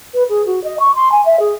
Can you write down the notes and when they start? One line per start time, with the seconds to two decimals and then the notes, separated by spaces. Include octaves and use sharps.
0.14 B4
0.29 G#4
0.45 F#4
0.63 D#5
0.79 C#6
0.95 C6
1.11 G#5
1.25 E5
1.39 G#4